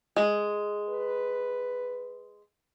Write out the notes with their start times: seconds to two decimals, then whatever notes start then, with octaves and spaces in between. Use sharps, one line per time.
0.16 G#3
0.89 B4